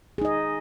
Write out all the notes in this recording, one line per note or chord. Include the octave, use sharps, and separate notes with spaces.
D#4 G#4 D#5